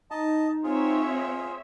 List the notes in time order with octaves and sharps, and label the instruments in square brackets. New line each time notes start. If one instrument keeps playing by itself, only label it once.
[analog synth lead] D#4 [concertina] D#5 A5
[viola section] C4 C#5 E5 [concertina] F4 G#4